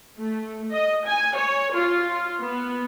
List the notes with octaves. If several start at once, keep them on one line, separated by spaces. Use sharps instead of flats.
A3
D#5
G#5
C#5
F4
B3